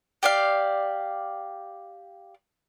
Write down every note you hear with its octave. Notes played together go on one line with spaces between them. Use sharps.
G4 D5 F5